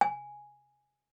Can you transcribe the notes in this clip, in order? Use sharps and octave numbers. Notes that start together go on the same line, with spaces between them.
G#5